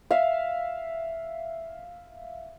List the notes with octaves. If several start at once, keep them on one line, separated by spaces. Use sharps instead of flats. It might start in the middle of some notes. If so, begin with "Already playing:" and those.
E5 F5